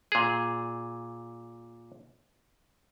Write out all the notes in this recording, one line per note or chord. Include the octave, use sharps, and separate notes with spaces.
A#2 G#4